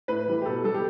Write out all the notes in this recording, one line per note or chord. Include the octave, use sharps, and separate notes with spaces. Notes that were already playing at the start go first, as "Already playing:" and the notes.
A2 B4
E3 G3
G4
B2 A4
G3 A4
G4